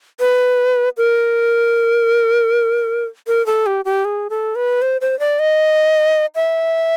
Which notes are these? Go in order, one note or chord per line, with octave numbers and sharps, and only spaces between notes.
B4
A#4
A#4
A4
G4
G4
G#4
A4
B4
C5
C5
D5
D#5
E5